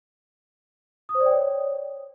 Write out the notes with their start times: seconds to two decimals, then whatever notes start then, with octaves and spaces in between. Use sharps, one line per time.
1.09 D#6
1.15 C5
1.20 D5
1.26 G5
1.32 C#5